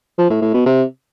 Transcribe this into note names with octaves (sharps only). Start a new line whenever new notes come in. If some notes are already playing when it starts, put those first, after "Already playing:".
F3
A2
A2
B2
C3